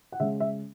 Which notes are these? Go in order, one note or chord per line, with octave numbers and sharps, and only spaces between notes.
F#5
C#3 G#3 C#4 E5
E5